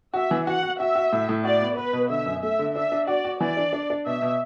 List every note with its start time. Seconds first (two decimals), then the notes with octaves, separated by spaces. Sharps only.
0.14 F#4 E5
0.31 E3
0.46 F#4 F#5
0.63 F#4
0.79 F#4 E5
0.95 F#4
1.13 A2
1.29 A2
1.44 F#4 D5
1.61 B3
1.77 B3 B4
1.93 B2
2.10 D3 E5
2.26 F#2
2.42 A3 E5
2.59 D3
2.76 D4 E5
2.92 D4
3.07 F#4 D5
3.25 F#4
3.40 E3 D5
3.57 D4
3.73 D4
3.90 D4
4.06 B2 E5
4.22 B2